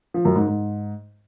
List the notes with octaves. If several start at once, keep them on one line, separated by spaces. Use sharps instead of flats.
F3
F#2
G#2
G#2